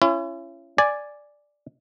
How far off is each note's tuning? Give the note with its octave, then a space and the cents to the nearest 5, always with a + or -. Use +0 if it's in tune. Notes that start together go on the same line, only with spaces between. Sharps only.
C#4 -5 E4 +40
D5 +0 G#5 +0